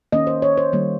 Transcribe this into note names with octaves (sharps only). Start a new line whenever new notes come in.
D#3 A#3 C#4 D#5
C5
C#5
C5
D#3 G3 A#3